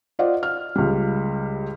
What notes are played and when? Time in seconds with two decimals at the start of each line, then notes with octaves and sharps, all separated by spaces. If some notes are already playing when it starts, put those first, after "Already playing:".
0.19 F4 C5 D5 D#5 F#5
0.43 F6
0.76 C#2 G3